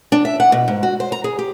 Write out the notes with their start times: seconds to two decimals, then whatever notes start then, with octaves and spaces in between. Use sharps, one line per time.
0.12 D4
0.25 E5
0.40 F#5
0.52 B2
0.68 G#2
0.83 F#4
1.00 C5
1.12 A#5
1.24 G#4
1.39 G4